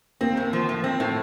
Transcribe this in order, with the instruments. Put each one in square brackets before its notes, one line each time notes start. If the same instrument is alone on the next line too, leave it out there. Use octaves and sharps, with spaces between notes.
[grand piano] A#3 [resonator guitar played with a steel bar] C4
[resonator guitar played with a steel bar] A2
F3
A2
C4
A2